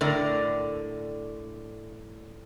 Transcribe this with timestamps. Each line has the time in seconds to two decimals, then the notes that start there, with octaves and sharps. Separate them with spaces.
0.01 A2 D3 A#4 D5